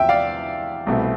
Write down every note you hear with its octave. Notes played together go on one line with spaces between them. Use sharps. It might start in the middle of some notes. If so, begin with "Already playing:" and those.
Already playing: E2 C3 F3 E5 G5
D5 F5
C2 B2 A3 C4